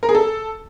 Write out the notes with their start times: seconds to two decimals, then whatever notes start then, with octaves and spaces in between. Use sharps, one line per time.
0.03 A#4
0.09 G#4
0.15 A4